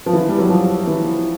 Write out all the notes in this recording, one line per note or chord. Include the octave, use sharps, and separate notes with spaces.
F3
E3
G3
F#3
F3
E3